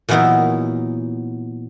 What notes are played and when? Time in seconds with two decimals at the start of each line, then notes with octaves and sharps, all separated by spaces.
0.09 A#2 E3 F#3 B3 D#4 E4